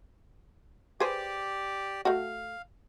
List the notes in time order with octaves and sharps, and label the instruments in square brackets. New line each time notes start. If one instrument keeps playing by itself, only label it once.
[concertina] G4 D5 [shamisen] G#4 B4 C5
[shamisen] A3 F#4 [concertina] F5